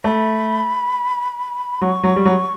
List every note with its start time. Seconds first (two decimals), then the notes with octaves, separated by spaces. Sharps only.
0.04 A3 B5
1.82 F#3 C#6
2.03 F#3
2.16 G3
2.25 F#3